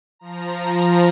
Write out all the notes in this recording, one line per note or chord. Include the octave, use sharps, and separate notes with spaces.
F3 A#5